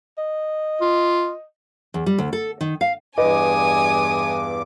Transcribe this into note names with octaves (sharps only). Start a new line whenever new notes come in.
D#5
F4
E2
G3
D2
A4
D#3
F5
E2 G2 B4 D#5 G#5 D6 D#6